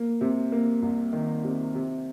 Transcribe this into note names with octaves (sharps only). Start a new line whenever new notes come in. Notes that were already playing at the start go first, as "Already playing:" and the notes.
Already playing: A#3
C3
A#3
C2
D#3
C3
C3